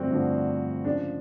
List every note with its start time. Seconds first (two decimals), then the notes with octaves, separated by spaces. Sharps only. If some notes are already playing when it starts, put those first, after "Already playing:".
Already playing: G2 D3 F3 A3 C4 F#4
0.11 G2 D3 F3 A3
0.85 C#3 F3 G#3 D4